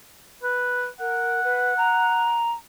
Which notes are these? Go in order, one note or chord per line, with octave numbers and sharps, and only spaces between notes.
B4
A#4 F#5
B4
A#5